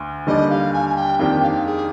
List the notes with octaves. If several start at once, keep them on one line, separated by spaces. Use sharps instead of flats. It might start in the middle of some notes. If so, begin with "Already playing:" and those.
Already playing: D2
D#2 D3 G3 D4 D#5
F5
G#5
G#5
G5
F2 D#3 A#3 D4 G4 G5
F5
G#4